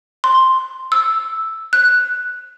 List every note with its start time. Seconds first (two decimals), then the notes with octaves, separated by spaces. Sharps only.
0.24 C6
0.92 E6
1.73 F#6